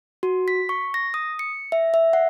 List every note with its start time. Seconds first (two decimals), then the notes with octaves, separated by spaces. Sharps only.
0.23 F#4
0.48 B6
0.69 C#6
0.94 A#6
1.14 D#6
1.39 C#7
1.72 E5
1.94 E5
2.13 F#5